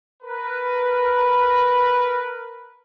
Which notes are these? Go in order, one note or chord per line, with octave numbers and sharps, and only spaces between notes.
A#4 B4